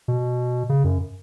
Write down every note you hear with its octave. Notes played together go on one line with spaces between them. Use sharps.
B2
C#3
F#2